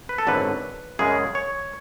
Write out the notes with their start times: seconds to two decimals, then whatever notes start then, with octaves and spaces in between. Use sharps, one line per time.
0.09 B4
0.18 A4
0.27 G#1 F#2 D3 F#3 B4
0.99 F#2 C#3 G#3 G#4
1.35 C#5